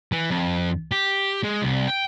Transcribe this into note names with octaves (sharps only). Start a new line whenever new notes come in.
E3
F2
G4
G#3
C2
G5